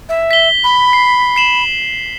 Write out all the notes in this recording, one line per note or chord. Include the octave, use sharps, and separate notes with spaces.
E5
B6 G7
B5
C7
C7 E7 F#7